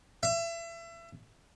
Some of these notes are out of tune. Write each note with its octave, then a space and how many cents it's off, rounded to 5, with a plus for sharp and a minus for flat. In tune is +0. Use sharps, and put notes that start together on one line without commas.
E5 +30